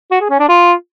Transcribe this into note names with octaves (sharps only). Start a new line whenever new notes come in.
F#4
G#4
C#4
D4
F4